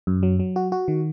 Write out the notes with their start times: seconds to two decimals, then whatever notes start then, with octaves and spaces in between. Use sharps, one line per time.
0.07 F#2
0.23 F#3
0.39 F#3
0.56 F#4
0.72 F#4
0.88 D#3